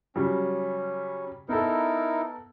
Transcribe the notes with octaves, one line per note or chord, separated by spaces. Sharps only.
C#3 F#3 G3 C#4
B3 D#4 E4 A4 A#4